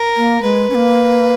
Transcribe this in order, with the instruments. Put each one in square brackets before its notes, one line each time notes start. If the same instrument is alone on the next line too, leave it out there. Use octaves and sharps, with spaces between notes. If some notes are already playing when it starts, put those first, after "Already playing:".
Already playing: [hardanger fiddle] A#4
[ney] A#3
[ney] G#3 [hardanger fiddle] B4
[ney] C#4
A#3